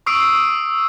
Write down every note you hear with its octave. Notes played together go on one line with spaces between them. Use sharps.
C#6 D#6 E6 C7 D7